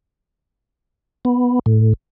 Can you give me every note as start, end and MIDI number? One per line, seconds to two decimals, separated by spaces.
1.25 1.59 59
1.66 1.93 45